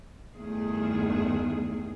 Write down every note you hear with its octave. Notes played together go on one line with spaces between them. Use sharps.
E2 G2 D#3 A3 G#4